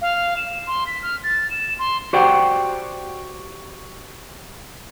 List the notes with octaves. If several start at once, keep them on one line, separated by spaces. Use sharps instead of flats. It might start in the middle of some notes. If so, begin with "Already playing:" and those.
F5
E7
C6
B6
F6
A6
E7
C6
F#4 G4 C5 D5 F#5 G5